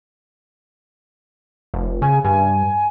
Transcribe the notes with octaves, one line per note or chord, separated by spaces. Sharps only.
F1
C#3 G#5
G2 G#5